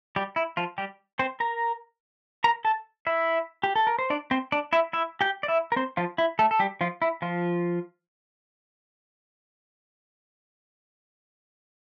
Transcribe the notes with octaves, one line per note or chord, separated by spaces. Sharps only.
G3 G4
E4
F3 F4
G3 G4
C4 C5
A#4 A#5
A#4 A#5
A4 A5
E4 E5
G4
A4
A#4
C5
D4 D5
C4 C5
D4 D5
E4 E5
E4 E5
G4 G5
D5
E4 E5
A#4
C4 C5
F3 F4
E4
A3 A4
A4
G3 G4
F3 F4
E4
F3 F4